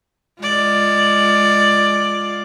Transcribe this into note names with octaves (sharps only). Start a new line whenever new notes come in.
G#3 F4 D5